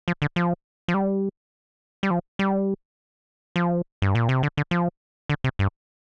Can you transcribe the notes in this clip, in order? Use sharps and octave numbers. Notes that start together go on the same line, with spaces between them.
F3
D3
F3
F3
G3
G3
F3
G3
F3
G2
A#2
C3
D3
D3
F3
D3
C3
G2